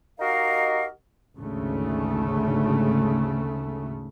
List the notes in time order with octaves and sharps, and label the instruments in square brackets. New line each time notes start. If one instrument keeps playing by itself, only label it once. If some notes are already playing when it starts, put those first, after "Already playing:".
[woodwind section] D#4 F#4 G4 A#4 D#5 F5
[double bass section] G#1 D2 C#3 A3